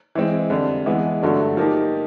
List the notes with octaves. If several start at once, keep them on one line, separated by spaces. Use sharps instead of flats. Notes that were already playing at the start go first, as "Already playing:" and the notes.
E3 G#3 C4
F2 D3 G3
E3 G#3 B3
G2 D3 F#3 A3 D4
F3 A#3 D#4 G4